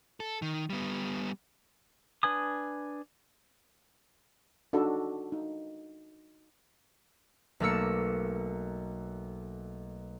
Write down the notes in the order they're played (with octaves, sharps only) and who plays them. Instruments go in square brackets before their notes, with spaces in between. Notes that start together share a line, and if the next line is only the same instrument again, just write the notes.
[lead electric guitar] A4
D#3
G3 B3
[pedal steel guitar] D4 B4 G#5 D#6
[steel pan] D4 D#4 F#4 A4
D#4
[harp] B1 A3 A#3 A4 E6 C#7